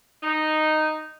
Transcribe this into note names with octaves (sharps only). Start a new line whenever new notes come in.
D#4